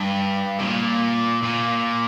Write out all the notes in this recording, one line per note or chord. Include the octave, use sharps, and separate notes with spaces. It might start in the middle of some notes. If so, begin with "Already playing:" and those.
Already playing: G2
C3
A#2
A#2